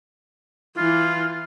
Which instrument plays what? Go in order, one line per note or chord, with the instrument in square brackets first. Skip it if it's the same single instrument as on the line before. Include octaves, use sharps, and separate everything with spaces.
[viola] E3 [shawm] F4